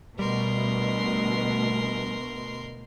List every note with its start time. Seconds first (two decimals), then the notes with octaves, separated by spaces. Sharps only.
0.19 D2 B2 G3 A#4 C6